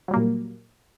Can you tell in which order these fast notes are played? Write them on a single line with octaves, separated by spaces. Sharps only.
F#3 G3 A#3 A#2